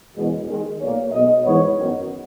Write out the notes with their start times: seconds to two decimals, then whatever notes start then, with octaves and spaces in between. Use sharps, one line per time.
0.16 F#1 E2 B2 G#3
0.48 D#2 D#3 G#3
0.79 B1 A#2 A#3 C#5
1.11 B1 B2 G#3 D#5
1.44 G#2 E3 B3 C#5
1.76 F#2 D#3 F#3 B3